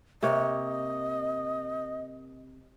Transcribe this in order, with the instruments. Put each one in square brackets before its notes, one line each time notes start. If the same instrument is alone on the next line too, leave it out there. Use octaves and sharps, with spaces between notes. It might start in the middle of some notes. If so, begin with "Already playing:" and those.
[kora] C3 A#3 C#5 [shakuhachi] D#5